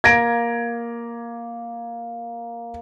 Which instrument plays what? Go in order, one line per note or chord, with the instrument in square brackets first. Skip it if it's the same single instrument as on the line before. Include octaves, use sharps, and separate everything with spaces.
[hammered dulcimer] A#3 [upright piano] G#6 A#6 D7